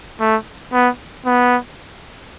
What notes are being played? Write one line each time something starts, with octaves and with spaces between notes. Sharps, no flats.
A3
B3
B3